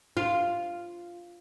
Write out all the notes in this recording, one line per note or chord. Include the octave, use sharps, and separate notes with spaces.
F4